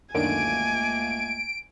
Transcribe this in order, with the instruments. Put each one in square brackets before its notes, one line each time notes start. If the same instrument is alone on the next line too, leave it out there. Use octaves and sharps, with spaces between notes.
[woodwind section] C#2 A3 A#3 [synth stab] F#2 D3 D#3 [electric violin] G#5 [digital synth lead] D7